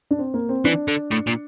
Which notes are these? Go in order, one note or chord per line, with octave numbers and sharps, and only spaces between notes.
D4
C4
A#3
C4
E3 D4
D3
A2
A#2